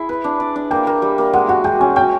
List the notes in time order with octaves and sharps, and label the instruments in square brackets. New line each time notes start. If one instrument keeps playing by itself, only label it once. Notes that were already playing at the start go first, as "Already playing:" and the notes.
Already playing: [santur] E4 G#4
B4
D4
D5
D4
[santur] A#3 [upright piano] G5
[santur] A#3
G3
A#3
[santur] G#3 [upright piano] F#5
[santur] F#4 [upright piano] F#5
[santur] G#3 [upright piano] G5
[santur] C#4 [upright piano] G#5
[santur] C#4 [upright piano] G5